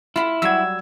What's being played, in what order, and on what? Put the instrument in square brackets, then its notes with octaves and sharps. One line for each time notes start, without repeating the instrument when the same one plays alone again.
[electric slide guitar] E4 [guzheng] F4 B5
[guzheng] F#3 G3 [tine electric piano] E6 G#6